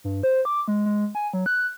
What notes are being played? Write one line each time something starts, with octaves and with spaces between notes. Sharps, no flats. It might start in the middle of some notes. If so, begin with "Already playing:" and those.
G2
C5
D6
G#3
G#3
G#5
F#3
F#6